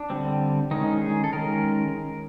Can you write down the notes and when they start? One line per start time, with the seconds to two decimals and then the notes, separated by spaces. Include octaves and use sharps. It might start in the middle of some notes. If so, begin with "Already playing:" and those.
Already playing: D4
0.10 D3 G3 C4
0.71 D#3 G#3 C#4 D#4
1.01 G#4
1.24 A4
1.33 D#3 G#3 C#4 A#4